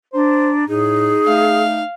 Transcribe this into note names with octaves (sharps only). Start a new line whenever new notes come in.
D4 C5 A#5
A2 D#4 G#4
A3 F5